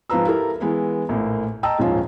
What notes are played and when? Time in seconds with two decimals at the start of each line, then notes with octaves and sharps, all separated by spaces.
0.10 G#2 F3 F4 B4 A#5 E6
0.25 E4 G4 A4 A#4
0.60 E3 G#3 B3 E4
1.09 A#1 A2 A#3
1.63 D#5 G5 A5 A#5 E6
1.79 D#1 G#2 F3 C#4 F4